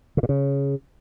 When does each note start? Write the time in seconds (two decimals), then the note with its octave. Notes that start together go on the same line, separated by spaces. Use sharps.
0.17 C#3
0.23 A#2
0.29 C#3